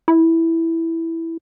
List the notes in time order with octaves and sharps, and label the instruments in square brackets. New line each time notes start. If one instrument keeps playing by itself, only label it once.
[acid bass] E4